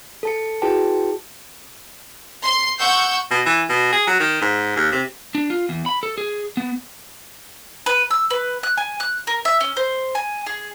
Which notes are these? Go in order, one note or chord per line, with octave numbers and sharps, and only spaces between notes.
A4 A5 C#7
E4 F#4 G#4 B4 G5 A5
C6
F#5 C#6 E6 G6
B2
E3
B2
G#4
F#3
D#3
G#2
D#2
C3
D4
F4
E2
B5
A4
G#4
B3
B4
E6
B4
F#6
G#5
F#6
A#4
E5
C#4
C5
G#5
G#4